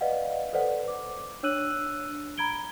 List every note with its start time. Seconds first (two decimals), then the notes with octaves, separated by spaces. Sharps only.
0.01 B4 D5 D#5 F5 F#5
0.53 A4 B4 C5 D5 F#5
0.88 D6
1.43 D4 C#5 E6 F#6 D#7 F#7
2.38 A#5 B5 G#6 D7 G7